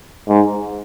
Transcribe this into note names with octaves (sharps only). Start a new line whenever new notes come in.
G#2